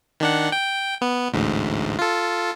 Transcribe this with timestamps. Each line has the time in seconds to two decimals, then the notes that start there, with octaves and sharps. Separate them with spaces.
0.20 D#3 D4 F#5
0.52 G5
1.01 B3
1.32 A1 D2 G#2
1.99 F4 A4